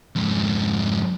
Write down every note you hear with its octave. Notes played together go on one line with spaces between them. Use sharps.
F2 G#2